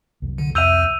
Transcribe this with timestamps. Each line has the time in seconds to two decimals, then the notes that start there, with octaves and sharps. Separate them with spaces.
0.22 C2 F#2
0.38 D3
0.55 F2 E5 E6 F6 G6 D#7 F7